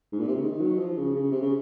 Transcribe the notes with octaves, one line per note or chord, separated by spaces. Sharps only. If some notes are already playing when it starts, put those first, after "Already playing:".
G#2
A#2
C3
C#3
D#3
F#3
F3
C#3
C#3
C3
C#3